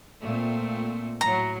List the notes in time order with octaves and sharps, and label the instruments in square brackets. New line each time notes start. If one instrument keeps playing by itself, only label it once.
[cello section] A#2 A3 C4
[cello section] A2 F#3 [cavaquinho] A#5